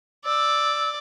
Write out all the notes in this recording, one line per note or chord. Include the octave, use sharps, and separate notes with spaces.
D5 E6